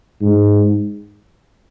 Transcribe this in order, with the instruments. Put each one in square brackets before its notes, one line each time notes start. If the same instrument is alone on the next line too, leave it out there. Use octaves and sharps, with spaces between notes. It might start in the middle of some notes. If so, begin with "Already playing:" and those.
[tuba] G#2